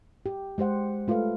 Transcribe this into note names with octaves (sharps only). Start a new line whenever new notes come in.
G4
G#3 G4 C5 F#5
A3 F4 A4 B4 F5